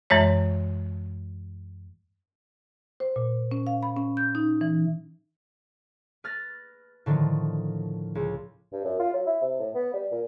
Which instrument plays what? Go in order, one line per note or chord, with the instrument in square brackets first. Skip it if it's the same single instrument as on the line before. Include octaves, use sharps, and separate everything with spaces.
[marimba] F#2 E3 G#3 C#5
C5
A#2
C#4
F5
B5
C#4
G6
D#4
E3
[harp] B4 F6 A6 A#6
A2 D3 D#3 F3
C#2
[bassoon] G2
F#2
F4
F#3
E4
C3
A2
B3
G3
A#2